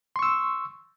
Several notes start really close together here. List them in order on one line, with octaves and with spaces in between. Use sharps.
C6 C#6 E6